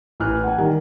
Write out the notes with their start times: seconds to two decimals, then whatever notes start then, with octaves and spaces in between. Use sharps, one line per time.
0.20 A1 E3 F6 F#6
0.43 F#5 G#5
0.58 D#3 G3